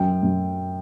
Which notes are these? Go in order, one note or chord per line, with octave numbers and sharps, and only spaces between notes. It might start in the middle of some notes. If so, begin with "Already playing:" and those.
Already playing: F#2 G5
F#2